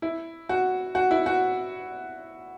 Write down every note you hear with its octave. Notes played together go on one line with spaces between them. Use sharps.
E4
F#4
F#4
E4
F#4